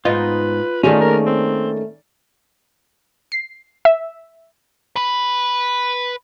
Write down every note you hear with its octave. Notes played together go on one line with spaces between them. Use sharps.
G#2 B3 D#4 F4 B4
D#3 A3 A#3 C#4 D#4 F4 G#4 D5
A#4
C4
C7
E5
B4 B5